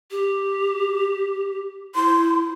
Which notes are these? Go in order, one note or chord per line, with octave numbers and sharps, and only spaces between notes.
G4
E4 C6